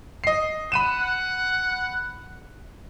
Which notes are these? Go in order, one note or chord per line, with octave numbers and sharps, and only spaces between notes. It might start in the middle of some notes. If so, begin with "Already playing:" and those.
D#5 C7
F#5 B5 D#7 E7